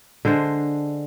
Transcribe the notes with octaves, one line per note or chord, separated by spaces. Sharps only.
D3 G#3 D4 C5